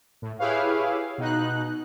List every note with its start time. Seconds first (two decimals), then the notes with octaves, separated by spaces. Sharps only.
0.22 A2
0.39 E4 G4 G#4 B4 C#5 F5
1.18 B2 D#4 F#6